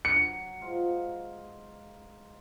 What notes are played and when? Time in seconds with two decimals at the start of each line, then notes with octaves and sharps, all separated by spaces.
0.05 F#3 C#7
0.61 G#2 F4